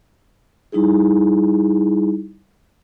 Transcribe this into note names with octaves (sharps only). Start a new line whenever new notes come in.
G3 D#4 E4 G#4